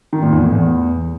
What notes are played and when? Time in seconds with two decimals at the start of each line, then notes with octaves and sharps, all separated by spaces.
0.13 D#3
0.23 A#2
0.32 E2
0.42 A2
0.52 E2